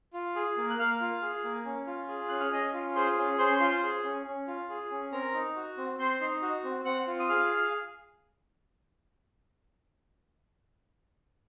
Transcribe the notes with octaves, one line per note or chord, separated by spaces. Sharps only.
F4
G#4
A#3
F#6
A#3 F5 F6
F4
G#4
A#3
C#4
F4
G#4
C#4 F#6
F6
C#4 D#5 D#6
F4
G#4 C5 C6
C#4
C#4 C5 C6
F4
G#4
C#4
C#4
F4
G#4
C#4
C4 A#4 A#5
D#4
F#4
C4
C4 C5 C6
D#4
F#4
C4
C4 F#5 F#6
F4
D#6
G#4 F5 F6